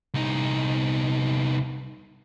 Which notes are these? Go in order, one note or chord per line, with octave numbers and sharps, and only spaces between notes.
C2 D#4